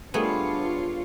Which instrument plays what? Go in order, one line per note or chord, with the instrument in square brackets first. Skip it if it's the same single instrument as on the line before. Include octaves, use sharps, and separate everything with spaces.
[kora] G3 A3 G#4 [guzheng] B3 [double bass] D4 [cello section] F4 C#5